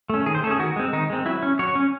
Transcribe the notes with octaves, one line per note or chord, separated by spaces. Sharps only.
A3 C#4
D#3 G#4
C5
A3 C#4 G#4 A4
D#3 F#4
G#3 C4
D#3 D#4
G#3 C4
F#3 E4
C#4
F#3 C#5
C#4